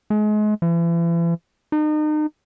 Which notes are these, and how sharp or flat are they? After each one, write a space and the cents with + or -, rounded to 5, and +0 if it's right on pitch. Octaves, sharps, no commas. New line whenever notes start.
G#3 +35
E3 +40
D#4 -35